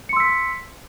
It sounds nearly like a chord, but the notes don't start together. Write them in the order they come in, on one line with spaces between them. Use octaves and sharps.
C#7 C6 E6 B6